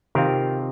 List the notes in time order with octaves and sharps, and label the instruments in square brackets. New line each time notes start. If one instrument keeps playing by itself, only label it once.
[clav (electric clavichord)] C3 D#3 C4 F4 A#4